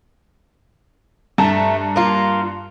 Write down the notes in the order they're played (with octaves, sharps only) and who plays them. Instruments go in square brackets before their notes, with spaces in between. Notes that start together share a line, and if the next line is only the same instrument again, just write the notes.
[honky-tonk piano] G2 A5 A#5 [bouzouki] A3
[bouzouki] A#3 F4